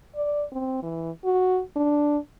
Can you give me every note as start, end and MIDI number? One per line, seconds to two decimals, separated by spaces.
0.16 0.44 74
0.52 0.78 60
0.83 1.11 52
1.24 1.61 66
1.76 2.18 62